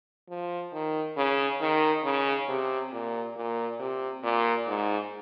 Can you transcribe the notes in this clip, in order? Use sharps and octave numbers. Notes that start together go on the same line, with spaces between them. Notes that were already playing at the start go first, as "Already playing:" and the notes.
F3
D#3
C#3
D#3
C#3
C3
A#2
A#2
C3
A#2
G#2